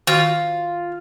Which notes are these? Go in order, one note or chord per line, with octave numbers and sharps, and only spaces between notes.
D#3 F4 F#4